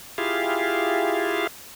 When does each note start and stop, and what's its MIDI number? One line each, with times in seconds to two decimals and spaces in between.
0.18 1.47 64
0.18 1.47 65
0.18 1.47 67
0.18 1.47 68
0.18 1.47 77